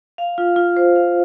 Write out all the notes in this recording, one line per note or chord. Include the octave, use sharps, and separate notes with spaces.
F5
F4
F4
C5
F5